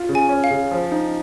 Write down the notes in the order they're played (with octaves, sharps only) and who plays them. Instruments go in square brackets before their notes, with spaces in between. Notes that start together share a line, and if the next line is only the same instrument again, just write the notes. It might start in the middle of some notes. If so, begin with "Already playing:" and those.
Already playing: [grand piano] F4
C#3
[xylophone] G#5
[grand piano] C#4
[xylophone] F5
[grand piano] C#3
F3
D#4